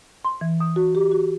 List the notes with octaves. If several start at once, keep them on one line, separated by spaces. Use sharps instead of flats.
C6
E3
D#6
F#4
G4
F#4